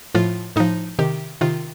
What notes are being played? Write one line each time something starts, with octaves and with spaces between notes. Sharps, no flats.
A2 F3 F4
A2 F3 D#4
C3 D#3 G4
C3 D#3 F4